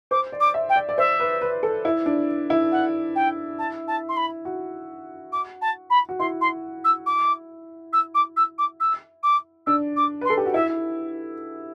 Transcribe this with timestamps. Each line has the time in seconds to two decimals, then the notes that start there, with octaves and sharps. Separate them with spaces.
0.11 C5 D6
0.32 D5
0.40 D6
0.54 E5
0.69 G5
0.76 D5
0.89 D5
0.98 C5 E5
1.20 B4
1.41 B4
1.63 A4
1.85 E4
2.06 D4
2.50 E4
2.72 F#5
3.15 G5
3.58 A5
3.88 A5
4.08 C6
4.16 B5
4.45 F#4
5.32 D6
5.61 A5
5.90 B5
6.09 F#4
6.19 E4 C6
6.41 C6
6.84 E6
7.06 D6
7.93 E6
8.14 D6
8.36 E6
8.58 D6
8.80 E6
9.23 D6
9.66 D4 E6
9.96 D6
10.21 B4
10.25 C6
10.30 A4
10.38 G4
10.46 F#4
10.54 E4 E5